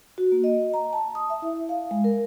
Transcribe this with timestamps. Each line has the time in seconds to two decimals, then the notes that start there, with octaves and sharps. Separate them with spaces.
0.18 F#4
0.32 A#3
0.44 D#5
0.74 A#5
0.93 A5
1.15 D#6
1.30 E5
1.42 E4
1.69 F5
1.91 G#3
2.04 A#4